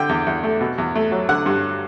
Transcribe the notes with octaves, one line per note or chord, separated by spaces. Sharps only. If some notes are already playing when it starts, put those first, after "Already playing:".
Already playing: D3 G5
E2
E2
A3
B2
E2
A3
F#3
D3 F#5
G2